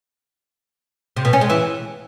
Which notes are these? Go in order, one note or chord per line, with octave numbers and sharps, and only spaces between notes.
C3
B2
C#4
G#3
E3